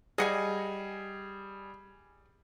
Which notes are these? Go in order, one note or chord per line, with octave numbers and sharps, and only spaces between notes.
G3 G#4 D#5 F#5 G#5